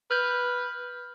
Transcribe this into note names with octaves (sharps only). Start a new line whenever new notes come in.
B4 F6 G6